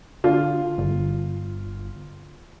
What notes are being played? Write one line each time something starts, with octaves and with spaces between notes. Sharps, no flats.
D3 F4
G1